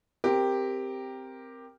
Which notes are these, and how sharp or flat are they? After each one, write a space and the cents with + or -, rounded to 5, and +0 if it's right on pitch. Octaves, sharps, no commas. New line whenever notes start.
C4 +0 G4 +5 A#4 +0